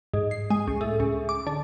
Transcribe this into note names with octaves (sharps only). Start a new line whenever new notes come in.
G#2
C7
G#3
C#2
A2
C#2
D6
D3